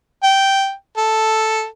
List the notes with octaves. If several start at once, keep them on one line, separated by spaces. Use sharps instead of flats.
G5
A4